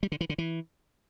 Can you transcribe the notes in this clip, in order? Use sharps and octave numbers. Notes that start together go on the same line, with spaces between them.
G3
D3
E3
D3
E3